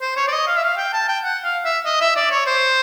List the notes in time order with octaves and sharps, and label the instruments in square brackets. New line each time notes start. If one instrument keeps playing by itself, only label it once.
[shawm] C5
C#5
D5
D#5
F5
E5
F5
G5
A5
G5
F#5
F5
E5
D#5
E5
D5
C#5
C5